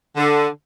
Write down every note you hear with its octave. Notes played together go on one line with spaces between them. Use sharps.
D3